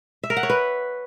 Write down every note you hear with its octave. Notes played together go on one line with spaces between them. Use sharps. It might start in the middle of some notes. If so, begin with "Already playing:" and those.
E5
A#4
F#5
C#5
B4